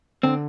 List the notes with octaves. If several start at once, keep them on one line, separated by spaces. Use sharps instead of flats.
D3 C4